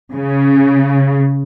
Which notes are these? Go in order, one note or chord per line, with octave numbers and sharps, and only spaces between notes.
C#3